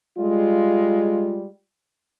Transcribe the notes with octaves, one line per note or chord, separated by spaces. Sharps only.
G3 G#3 F4